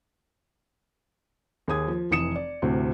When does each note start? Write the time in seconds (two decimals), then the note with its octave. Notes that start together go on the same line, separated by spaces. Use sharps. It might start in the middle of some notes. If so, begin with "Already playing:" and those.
1.68 D#2 G#4 D#6 G#6
1.88 F3
2.11 F1 E3 D#6 C#7 E7
2.36 D5
2.62 D2 A2 C3